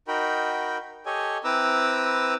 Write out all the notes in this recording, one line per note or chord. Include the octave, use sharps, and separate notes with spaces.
D#4 F#4 A#4 G5 B5
G4 A4 C#5 D#5 G#5
C4 E4 B4 A#5 D6 E6